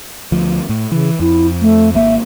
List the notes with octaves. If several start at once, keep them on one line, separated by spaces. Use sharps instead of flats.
D2 F3
A2
C#3 E3
F2 E4
A3
G#1 A#3 E5